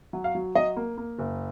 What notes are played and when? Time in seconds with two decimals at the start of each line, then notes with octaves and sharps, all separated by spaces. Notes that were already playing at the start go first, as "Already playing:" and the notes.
0.13 F#3
0.24 F5
0.35 F#3
0.55 F#3 D#5
0.77 A#3
0.98 A#3
1.19 F#1